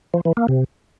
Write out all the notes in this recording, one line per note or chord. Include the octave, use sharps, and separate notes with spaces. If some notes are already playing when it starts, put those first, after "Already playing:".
F3
E3
A#3
C3